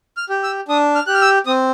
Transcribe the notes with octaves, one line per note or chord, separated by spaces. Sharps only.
F6
G4
E6
D4 D#6
F6
G4 F#6
F6
E6
C4 D#6